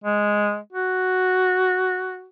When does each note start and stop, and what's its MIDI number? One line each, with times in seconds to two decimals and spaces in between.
0.04 0.58 56
0.73 2.27 66